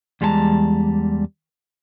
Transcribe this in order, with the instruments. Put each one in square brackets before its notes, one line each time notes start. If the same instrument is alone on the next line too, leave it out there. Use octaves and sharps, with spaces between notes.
[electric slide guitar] E2 G3 G#3 E4 A5 A#5